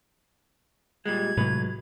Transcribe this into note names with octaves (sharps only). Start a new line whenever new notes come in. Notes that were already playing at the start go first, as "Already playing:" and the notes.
A#2 G3 G#3 G#6
A2 C3 F#3 G#3 B4